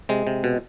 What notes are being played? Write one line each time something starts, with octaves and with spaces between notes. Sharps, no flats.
C3 G#3
C3
B2